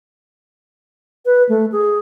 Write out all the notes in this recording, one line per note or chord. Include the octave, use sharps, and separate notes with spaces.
B4
A3
G#4